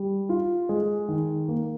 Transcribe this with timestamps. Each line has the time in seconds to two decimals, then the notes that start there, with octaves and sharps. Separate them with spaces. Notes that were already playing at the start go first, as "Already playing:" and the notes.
Already playing: G3
0.29 F4
0.69 G#3
1.08 D#3
1.48 A#3